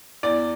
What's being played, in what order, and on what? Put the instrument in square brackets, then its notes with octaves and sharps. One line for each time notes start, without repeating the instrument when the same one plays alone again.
[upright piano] E2 D5